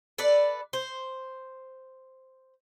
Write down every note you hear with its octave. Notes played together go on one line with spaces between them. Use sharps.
A4 B4 D5
C5